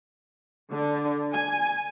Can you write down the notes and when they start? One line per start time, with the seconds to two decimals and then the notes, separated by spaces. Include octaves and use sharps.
0.72 D3
1.33 G#5